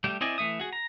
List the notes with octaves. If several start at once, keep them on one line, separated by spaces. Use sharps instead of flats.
G3 A3 G4
C4 E4 D5 D#5 G#5
E3 A3 E5 D#6
F#4 G#4
A#5